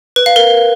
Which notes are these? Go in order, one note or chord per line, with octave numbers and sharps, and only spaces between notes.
B4
F5
A#4